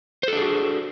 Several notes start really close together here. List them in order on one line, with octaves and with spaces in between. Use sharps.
C5 A4 D4 G#4 F#4